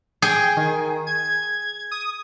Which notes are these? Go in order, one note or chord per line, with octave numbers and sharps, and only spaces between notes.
G#4 G5
D#3
G#6
D#6